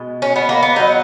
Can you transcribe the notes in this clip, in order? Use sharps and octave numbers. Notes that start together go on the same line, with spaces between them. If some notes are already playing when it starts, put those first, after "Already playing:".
Already playing: B2 G#3
C#4
B3
A#3
B3
B2 F#3 D#4